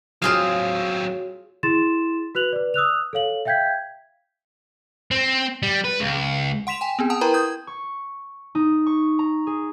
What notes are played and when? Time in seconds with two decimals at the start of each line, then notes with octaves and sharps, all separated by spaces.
0.22 F#3 C4 F4 F#4 G#4 C#5 F5
1.63 E4 G#4 C6 A6 E7
2.35 F#4 B4 F#6 F7 F#7
2.53 B4 D5
2.74 D#6 E6 F#6 F7
3.13 A4 C#5 F5 F#7
3.45 E5 F5 G5 G6 G#6 B6
5.11 C4
5.63 G3
5.85 B4
6.00 C#2
6.67 F#5 C6 B6 E7 F7
6.81 G5 G#5
6.99 B3 C4 G#4
7.10 F#5 G#5 A5 D#6
7.21 E4 A#4 B4 G5 A#5 B5
7.34 D#6 G6 G#6
7.67 C#6
8.55 D#4
8.87 C#6
9.19 A#5
9.47 G#4